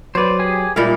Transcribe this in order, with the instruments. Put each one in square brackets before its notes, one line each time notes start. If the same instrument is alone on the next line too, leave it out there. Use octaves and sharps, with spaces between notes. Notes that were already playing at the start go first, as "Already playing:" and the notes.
[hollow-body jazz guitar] F#3 B4 [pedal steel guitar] C5 D5
[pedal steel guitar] G4 G#4 G#5
[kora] A#2 E4 F5 [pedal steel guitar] G3 A#3 D#4